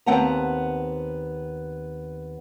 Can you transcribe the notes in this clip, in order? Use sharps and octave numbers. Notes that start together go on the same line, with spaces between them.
D#2 B3 C4 F#5 A5 A#5